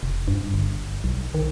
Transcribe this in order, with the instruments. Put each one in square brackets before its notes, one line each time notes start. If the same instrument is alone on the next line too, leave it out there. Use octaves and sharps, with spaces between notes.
[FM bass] F1
G2
G1
B1
D#3